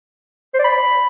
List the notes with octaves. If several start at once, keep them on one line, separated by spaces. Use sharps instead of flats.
C5
D5
B5